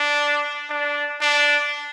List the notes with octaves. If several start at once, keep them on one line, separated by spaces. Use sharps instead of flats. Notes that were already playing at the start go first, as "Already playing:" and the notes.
Already playing: D4
D4
D4